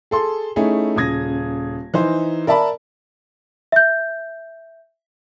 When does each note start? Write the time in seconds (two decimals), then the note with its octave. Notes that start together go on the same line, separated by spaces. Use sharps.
0.11 G#4 A4 C6
0.56 A3 C#4 D#4 E4 G#4
0.96 D#1 C#3 D#6 G#6 A#6
1.94 E3 D#4 C5
2.47 A#4 D5 E5 A5 B5
3.72 E5 G6